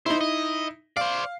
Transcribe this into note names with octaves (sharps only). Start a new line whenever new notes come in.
D#4 E4 C5
D#5
C5 D5 F5